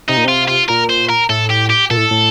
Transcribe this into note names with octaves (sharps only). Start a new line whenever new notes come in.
C3 D#4
A#2
C3 F4
F4
A#2 A#4
C5
A#4
A2 A4
G4
G4
A#2 A4
A2
A2